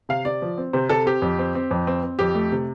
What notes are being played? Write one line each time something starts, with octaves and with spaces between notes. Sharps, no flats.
C3 F5
C3 D5
F3
C4
C3 C5
C3 A4
C4 G4
F2
C4
C4
F2
C4
C4
F2 G4
A3
C3